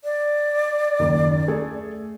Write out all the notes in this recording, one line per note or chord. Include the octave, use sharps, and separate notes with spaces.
D5
F#1 D#2
A3 G#4 A4